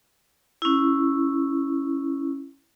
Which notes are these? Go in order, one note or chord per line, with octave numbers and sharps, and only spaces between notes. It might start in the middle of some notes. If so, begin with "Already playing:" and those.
C#4 E4